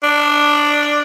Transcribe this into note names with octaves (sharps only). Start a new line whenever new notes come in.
D4